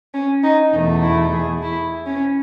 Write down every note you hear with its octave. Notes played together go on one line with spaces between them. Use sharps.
C#4
D#4
E2 B2 A3 D#4
E4
G#4
E4
C#4